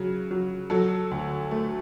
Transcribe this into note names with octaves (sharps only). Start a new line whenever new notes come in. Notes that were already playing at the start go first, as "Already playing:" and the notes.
Already playing: C#3 F#3
F#3
F#3 A4
D2
A3